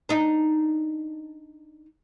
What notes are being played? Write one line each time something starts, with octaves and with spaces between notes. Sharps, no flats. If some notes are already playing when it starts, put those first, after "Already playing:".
D4 D#4